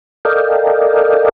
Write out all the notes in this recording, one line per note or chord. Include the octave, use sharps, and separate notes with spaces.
A4 A#4 D5 D#5 F5 G5